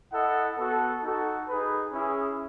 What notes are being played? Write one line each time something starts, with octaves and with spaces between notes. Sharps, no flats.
E4 A4 D#5 F#5
B3 F#4 A4
D#4 F#4 A4
D#4 G#4 B4
C#4 E4 G#4